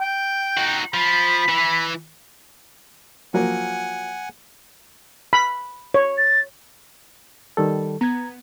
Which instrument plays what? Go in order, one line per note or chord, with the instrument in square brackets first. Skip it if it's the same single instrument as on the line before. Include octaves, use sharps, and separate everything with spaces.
[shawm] G5
[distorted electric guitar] D#4 F#4
[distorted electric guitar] F3 [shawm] B5
[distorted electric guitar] E3
[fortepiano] F3 F#3 A#3 [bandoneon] F#5 G#5
[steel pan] B5
C#5
[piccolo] A6
[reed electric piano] D#3 G3 A4
[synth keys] B3 [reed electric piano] A#5 G#6